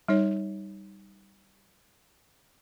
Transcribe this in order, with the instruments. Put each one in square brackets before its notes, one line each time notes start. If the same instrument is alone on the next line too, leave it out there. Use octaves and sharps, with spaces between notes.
[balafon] G3 D#4 C#5